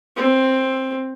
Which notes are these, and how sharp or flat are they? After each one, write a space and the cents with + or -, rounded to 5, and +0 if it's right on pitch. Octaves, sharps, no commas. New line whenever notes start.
C4 +10